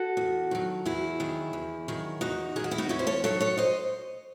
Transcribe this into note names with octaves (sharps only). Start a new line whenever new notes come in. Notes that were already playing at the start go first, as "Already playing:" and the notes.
Already playing: F#4 A4
E2
D#3 F#3
E2 E4 G#4
D#3 F#3
E2
D#3 F#3
E2 D#4 F#4
D#3 F#3 F#4 G#4
E4
D#4 F#4
E2 C#4 E4
C5
A4 C#5
D#3 F#3 A4 C#5
A4 C#5
C5 D#5